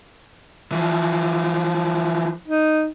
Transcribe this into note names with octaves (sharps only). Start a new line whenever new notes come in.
E3 F3
D#4